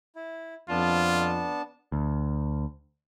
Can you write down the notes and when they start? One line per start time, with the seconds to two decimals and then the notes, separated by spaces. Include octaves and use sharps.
0.16 E4
0.70 F2 B3 D4 F4 A5
1.92 D2